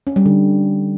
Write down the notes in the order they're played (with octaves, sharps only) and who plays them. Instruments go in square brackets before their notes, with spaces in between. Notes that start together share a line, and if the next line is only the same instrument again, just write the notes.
[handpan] C#4
G3
D3